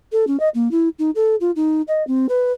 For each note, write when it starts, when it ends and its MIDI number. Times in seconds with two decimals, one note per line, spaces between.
0.12 0.25 69
0.27 0.39 61
0.40 0.49 75
0.54 0.71 58
0.71 0.89 64
0.99 1.10 63
1.15 1.35 69
1.40 1.51 65
1.56 1.82 63
1.88 2.05 75
2.07 2.26 60
2.29 2.52 71